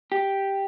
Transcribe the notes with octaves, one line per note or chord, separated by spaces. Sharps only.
G4